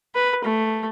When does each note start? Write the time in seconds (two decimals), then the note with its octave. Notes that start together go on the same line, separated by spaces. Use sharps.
0.15 B4
0.45 A3